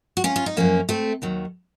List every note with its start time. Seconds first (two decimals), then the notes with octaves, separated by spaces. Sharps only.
0.17 F#4
0.24 C#4 F4
0.36 F4
0.46 D#4
0.57 F#2 F3 A#3 C#4
0.89 A3 C4
1.22 D#2 D#3 F#3